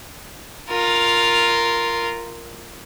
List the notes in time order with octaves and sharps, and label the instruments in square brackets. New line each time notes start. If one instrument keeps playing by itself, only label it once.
[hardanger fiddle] F4 A#4